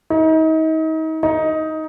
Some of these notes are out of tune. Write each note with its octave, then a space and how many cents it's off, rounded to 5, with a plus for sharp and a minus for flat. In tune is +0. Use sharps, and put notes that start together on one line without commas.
D#4 +35
D#4 +15